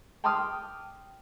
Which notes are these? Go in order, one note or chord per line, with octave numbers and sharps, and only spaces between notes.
G5 A5 C6 D6 D#6 F6